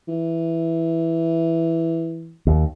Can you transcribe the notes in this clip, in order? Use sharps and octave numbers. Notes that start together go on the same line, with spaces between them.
E3
D#2